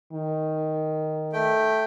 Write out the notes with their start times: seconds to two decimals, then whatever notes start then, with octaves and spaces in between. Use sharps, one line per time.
0.12 D#3
1.33 A3 G5